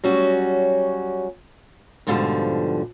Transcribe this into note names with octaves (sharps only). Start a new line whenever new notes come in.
F#3 G3 C#4 F#4
F2 G#2 B2 D3 F3 G3